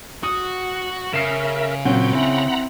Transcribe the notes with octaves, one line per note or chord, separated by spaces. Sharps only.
F#4 D#6
C#3 A#4 E5 C7 E7
A#2 F#3 C4 C#4 F#5 G5
C4 E4 F#5 A#5 B5